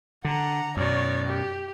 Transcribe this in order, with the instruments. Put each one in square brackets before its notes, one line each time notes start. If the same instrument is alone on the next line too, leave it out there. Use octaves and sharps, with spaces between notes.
[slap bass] D3 [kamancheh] F#5 A#5
[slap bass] F#2 B2 [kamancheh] C#5 D5
[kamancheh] G4